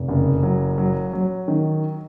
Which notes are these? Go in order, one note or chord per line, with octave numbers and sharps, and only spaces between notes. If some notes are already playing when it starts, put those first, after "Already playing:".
Already playing: F1
F#1
F#3
F#3
F#3
D#3